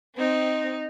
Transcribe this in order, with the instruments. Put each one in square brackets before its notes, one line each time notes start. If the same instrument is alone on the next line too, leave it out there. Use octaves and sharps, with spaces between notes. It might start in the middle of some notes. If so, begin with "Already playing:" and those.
[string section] C4 [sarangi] D#4